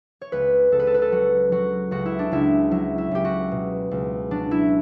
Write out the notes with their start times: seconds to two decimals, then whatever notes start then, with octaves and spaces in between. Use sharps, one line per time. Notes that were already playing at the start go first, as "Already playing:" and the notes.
0.21 C#5
0.32 C#2 B4
0.72 C#2 A4
0.79 B4
0.87 A4
0.94 B4
1.02 A4
1.12 F#3 F#4
1.52 F#3 F#4
1.91 C#2 F#4
2.06 E4
2.19 D4
2.32 C#2 E4
2.71 F#3 E4
2.98 E4
3.11 C#2 G4
3.25 F#4
3.51 B2
3.91 C#2
4.31 F#3 D4
4.51 E4